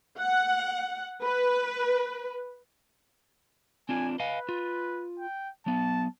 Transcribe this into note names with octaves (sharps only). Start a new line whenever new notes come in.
F#5
B4
C4 D4 F4 G#5
B4 D#5 F5 G#5
F4
G5
F#3 B3 A5